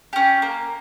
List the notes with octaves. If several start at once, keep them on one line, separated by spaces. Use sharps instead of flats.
C#4 G4
A#3